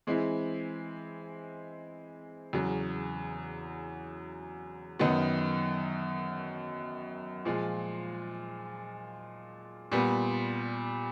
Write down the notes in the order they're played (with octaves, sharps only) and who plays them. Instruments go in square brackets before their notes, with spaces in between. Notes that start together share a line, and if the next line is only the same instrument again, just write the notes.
[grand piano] E3 G#3 C4 E4
E2 C#3 F#3
F#2 D#3 F#3 B3
A#2 F3 G#3
A#2 G3 B3